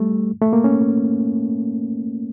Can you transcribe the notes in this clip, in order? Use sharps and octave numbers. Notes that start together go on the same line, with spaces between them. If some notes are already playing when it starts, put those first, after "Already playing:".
Already playing: G3 A3
A3
A#3
C#4